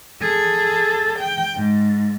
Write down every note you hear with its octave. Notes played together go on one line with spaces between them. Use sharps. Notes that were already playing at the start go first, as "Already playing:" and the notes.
G#4 A4
G5
G#2